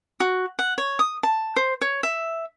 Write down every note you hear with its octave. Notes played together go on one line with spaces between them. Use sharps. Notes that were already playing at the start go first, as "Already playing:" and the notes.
F#4
F#5
C#5
D#6
A5
C5
C#5
E5